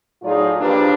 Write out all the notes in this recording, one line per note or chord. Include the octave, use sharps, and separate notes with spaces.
A2 F#3 D#4 F4 G#4 D5
G2 F3 G3 A#3 D4 B4